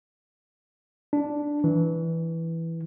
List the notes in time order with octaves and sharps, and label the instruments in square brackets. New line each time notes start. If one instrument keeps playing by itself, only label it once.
[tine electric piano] D4
E3